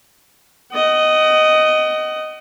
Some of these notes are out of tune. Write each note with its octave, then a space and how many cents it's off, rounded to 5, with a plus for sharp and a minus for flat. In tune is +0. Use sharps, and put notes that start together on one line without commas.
D#5 +0 F#5 +40